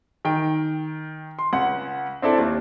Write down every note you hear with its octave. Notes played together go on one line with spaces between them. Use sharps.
D#3 G5
C6
C#2 F#5
C4 D4 E4 A4
D#2